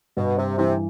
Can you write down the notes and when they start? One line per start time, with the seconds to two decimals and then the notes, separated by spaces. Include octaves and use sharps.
0.17 G2 B2
0.38 C3
0.58 C3 E3